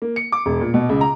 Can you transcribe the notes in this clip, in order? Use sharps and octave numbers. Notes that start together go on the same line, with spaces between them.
A#3
C#7
D6
E1
A#2
B2
C#2
A#5